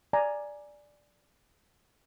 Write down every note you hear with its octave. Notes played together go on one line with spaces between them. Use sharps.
D5 G#5 A#5